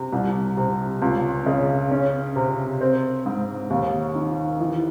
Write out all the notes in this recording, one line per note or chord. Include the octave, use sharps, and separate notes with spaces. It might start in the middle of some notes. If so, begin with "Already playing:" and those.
Already playing: C3
C2
C3
C#2
C#3
C#4
C3
C4
G#2
D#2
D#3
E3